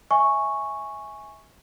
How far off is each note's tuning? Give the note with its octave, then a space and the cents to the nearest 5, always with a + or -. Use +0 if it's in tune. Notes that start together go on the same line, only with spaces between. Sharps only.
E5 -25 G#5 +0 C#6 -5